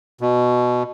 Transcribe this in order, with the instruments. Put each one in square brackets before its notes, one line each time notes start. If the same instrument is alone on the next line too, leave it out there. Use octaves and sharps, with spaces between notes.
[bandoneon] B2